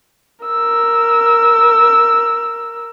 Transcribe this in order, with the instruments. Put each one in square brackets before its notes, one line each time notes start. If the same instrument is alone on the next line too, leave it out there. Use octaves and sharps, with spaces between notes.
[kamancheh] A#4 E6